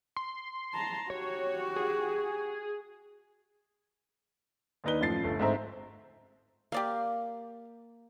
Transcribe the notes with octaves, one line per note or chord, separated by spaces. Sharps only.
C6
A5 A#5
F#4 G4 C#5
G#4
D#2 D4 D#4 B4 G7
F#2 A2 F3 A6 C7
G1 A3
G#2 A3 C4 C5 E5 A#5
A#3 G4 D5 F5